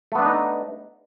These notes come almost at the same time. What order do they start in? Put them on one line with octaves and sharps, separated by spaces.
A3 B3 D4 B4 D#4